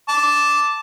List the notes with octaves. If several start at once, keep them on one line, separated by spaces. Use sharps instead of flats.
A5 D6